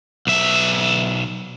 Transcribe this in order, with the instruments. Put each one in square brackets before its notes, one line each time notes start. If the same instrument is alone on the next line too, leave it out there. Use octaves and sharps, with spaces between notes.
[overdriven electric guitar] B1 E5